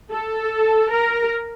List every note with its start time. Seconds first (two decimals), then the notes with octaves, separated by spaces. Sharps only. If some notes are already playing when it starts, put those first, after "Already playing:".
0.11 A4
0.90 A#4